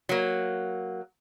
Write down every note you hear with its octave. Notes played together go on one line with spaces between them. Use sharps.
F#3 A#3